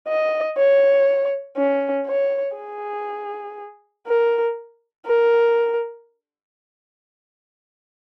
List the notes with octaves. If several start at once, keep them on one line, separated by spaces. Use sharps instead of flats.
D#5
C#5
C#4
C#5
G#4
A#4
A#4